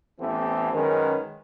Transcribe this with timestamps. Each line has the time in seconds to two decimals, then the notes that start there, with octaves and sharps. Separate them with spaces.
0.20 A1 E3 B3 C4 G4 A4
0.73 F#2 D#3 G#3 C#4 A#4 B4